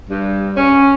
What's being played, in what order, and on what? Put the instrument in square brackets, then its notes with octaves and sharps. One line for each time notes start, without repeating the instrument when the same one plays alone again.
[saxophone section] G2
C#4